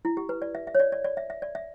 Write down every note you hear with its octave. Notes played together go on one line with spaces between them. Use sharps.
E4
G4
B4
D5
E5
E5
C#5
D5
D5
D5
E5
E5
D5
E5